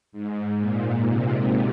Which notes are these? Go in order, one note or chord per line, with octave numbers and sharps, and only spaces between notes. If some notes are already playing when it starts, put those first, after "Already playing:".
G#2
A#2
C3